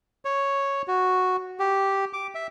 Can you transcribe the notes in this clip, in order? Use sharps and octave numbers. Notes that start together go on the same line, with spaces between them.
C#5
F#4
G4
D6
E5